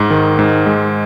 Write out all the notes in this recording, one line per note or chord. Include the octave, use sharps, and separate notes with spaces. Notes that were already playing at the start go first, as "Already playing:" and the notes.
Already playing: G#2
D#3
G#2
G#3